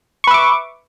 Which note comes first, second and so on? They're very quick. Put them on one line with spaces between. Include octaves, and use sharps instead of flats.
C#6 B4 E5 D6